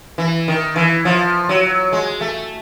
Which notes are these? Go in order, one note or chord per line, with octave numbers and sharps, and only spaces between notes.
E3
D#3
E3
F3
F#3
G#3
A3